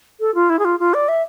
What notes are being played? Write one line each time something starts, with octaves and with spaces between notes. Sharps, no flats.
A4
F4
E4
G#4
F4
F4
D5
E5